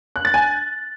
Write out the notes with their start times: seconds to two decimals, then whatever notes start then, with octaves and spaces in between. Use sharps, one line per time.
0.16 F#6
0.25 A6
0.34 G#5